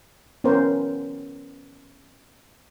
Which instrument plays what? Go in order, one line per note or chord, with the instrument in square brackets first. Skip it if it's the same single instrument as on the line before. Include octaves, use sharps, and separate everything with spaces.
[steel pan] B3 C#4 A#4 C5